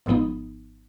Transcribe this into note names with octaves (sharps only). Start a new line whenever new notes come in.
G#1 G#2 F3 B3 D#4